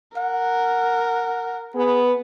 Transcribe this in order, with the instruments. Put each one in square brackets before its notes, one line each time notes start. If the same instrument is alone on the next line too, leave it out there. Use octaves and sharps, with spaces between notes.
[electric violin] A#4 [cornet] F#5
[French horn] B3 [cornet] G#4